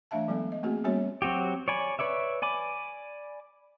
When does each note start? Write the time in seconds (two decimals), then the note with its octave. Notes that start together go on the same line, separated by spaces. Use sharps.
0.11 E3 A3 D4 E5 F5 A5
0.28 F#3 G#3 B3 A4
0.52 D#5
0.63 A3 A#3 C4 F#4 G#4
0.84 G3 A#3 B3 C#4 F#4 C#5
1.22 F#3 C4 F#4 G4
1.68 C#5 D5 G#5 B5
1.99 B4 C#5 D5 E5
2.42 D5 G#5 B5 D6